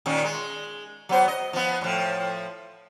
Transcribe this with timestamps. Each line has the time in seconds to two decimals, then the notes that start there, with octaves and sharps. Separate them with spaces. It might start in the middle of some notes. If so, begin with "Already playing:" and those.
0.06 A#2 D#3 C#4
0.24 G#3
1.09 F#3 B3 C5
1.28 D#5
1.53 F3 B3
1.81 A2 F3